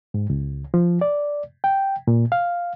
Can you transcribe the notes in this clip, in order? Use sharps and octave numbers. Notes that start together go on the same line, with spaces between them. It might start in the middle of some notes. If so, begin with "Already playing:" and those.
G#2
C#2
F3
D5
G5
A#2
F5